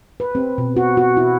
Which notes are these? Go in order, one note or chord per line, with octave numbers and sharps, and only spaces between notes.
B4
C4
B2
F#4
F#4
E4